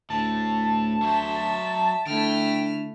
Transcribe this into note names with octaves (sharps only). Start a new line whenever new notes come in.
D2 A2 A5
F#3 C5 E5
D3 A3 E4 G5 F6